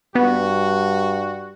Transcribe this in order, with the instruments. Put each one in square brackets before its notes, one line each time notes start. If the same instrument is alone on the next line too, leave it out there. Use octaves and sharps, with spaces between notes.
[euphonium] G2 [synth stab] B3 [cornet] F#4